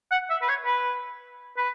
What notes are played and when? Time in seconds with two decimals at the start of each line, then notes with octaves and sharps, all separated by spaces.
0.12 F#5
0.30 E5
0.42 B4
0.49 C#5
0.66 B4
1.58 B4